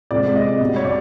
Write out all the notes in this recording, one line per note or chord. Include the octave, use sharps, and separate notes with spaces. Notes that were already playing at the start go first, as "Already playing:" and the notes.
C3 F3 G#3 C4 D5
D#5
B2 G3 C4
C#5
D5